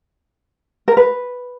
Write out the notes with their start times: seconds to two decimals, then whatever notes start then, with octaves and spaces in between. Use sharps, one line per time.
0.88 A#4
0.97 B4